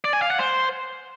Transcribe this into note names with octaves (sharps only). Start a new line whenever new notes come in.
D5
G#5
F5
F#5
C5